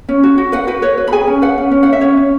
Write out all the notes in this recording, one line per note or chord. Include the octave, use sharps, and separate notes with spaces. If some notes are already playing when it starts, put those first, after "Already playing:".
C#4
F#4
F#4
B4 F#5
F#4 B4
B4 C#5
B4
B5
G#4 G#5
C#4
B4 F#5
C#4
C#4
F#5
C#4
E5
C#4 C#5
C#4